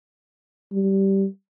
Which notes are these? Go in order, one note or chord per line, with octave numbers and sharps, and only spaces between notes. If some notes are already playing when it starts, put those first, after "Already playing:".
G3